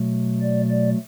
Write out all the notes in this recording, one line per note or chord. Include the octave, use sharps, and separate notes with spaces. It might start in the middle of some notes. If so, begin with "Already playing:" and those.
Already playing: B2 F#3 A3
D5
D5